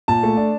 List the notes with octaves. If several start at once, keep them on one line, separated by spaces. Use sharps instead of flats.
A#2 A5
A3
D4